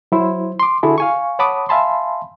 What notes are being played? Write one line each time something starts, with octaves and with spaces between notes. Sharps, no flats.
F#3 E4 C5
C6 D6
D3 E4 F#4 G#4 A4
F5 G#5 C#6
C#5 F#5 A5 B5 D6 D#6
E5 F5 G#5 A5 B5 C6